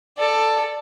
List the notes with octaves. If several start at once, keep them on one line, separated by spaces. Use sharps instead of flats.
A4 D5